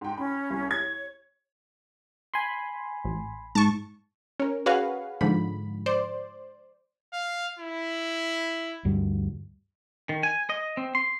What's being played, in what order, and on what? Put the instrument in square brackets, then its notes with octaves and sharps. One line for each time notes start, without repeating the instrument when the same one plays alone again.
[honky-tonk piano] G#2 G5
[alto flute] C#4 [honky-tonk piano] B5
[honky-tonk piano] C2
[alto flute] C#5 [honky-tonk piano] G#6
[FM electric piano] G#5 B5 C6
[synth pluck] A1
[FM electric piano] G#2 [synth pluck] A5 C#6
[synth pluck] C#4 A#4
F#4 G#4 B4 C#5 F5
G#2 D3 F3 B5
C5 D5
[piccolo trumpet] F5
E4
[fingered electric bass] D2 G2 G3
[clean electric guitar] D#3
G#5
D#5
C4
C6